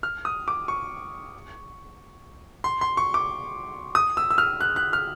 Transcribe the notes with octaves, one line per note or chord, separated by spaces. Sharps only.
F6
D#6
D6
C#6
C6
C6
C#6
D6
D#6
E6
E6
F6
F#6
F#6
F6